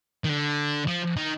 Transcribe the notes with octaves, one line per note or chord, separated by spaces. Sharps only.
D#3
D3
F3
D#3